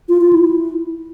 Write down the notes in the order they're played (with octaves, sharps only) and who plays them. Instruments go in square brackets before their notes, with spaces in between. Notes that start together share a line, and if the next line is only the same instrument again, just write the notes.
[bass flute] F4
F4
E4